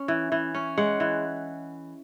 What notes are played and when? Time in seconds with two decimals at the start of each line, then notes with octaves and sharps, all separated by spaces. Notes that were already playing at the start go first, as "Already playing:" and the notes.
Already playing: C#4
0.08 E3
0.32 E3
0.55 C#4
0.78 G#3 F#5
1.00 E3